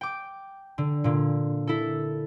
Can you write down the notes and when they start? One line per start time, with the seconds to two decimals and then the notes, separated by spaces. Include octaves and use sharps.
0.01 G5 D6
0.78 D3
1.04 A#2 D3
1.67 E4 A4